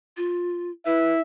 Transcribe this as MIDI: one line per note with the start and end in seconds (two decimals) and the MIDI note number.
0.17 0.71 65
0.86 1.20 64
0.86 1.13 71
0.86 1.22 76